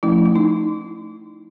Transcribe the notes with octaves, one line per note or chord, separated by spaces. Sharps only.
F3 A3 C#4 E4
E4
D#4